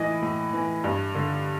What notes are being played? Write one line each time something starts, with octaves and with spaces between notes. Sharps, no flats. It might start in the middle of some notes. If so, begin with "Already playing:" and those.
Already playing: A2 E3 B4 D#5
A2
E3
G2
D3